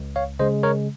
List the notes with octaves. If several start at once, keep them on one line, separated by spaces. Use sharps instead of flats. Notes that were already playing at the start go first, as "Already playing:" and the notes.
Already playing: C#2
C#5 F5
C#3 G#3 C5 D#5
A#4 C#5